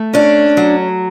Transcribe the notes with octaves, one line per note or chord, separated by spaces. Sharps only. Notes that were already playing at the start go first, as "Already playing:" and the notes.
Already playing: A3
C#4 D4
F#3